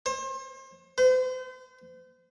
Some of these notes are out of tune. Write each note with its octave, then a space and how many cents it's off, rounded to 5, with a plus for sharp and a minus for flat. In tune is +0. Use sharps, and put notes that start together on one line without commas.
C5 +35
C5 -40